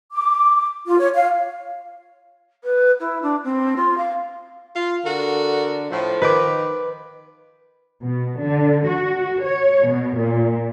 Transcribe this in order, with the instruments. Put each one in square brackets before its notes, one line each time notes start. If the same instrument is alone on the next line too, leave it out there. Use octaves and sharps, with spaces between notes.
[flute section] D6
F4
C#5
F5
[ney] B4
E4
D4
C4
F4
F5
[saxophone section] F4
[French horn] D3 [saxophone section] F#4 A4 A#4
[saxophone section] A2 [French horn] F3
[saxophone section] D#3 [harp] B4 D6
[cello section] B2
D3
F#4
C#5
B2
A#2